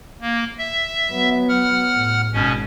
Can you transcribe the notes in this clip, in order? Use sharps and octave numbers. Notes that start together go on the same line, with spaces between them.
A#3
E5
F#3 B3
F#5 F6
A2
G#1 B2 C#4